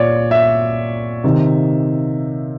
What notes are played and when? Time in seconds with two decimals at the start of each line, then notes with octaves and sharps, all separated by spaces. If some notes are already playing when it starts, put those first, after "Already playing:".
Already playing: A#2 C#5 D5
0.31 E5
1.24 C3 D#3